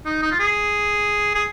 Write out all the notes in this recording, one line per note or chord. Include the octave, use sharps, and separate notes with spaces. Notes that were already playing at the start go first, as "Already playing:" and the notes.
D#4
D#4
F4
G#4
G#4